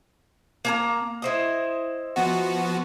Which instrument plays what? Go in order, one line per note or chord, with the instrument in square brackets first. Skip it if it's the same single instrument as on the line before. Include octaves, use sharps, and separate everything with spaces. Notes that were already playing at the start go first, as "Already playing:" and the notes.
[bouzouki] A#3 G#5 A#5
E4 C5 D#5
[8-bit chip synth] F3 B3 F#4